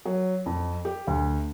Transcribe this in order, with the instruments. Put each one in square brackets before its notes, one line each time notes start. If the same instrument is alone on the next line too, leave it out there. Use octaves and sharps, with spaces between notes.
[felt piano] F#3
F2
G4
D2